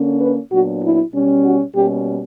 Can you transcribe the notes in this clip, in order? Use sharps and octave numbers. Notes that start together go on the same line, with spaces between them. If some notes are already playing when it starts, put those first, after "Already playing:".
Already playing: D3 A#3 C#4
B4
A#2 F#3 B3 D4 F#4
E4
B2 G3 C#4
F#4
B2 G3 A#3 C#4 G4